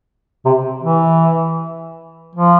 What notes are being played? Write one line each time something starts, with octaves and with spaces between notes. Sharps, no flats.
C3
E3
F3